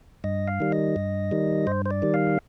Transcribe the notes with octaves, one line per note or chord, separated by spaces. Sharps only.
G2 D#5
F5
D#3 G3
D#5
G2
D#3 G3
G2 C5
C5
D5
D#3 G3
F5